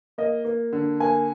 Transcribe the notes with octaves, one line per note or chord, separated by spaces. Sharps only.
A#3 D#5
A#3
D3
A#3 G#5